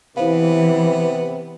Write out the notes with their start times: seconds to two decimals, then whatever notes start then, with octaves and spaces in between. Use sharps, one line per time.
0.17 C3 E3 B3 E4 C5 F5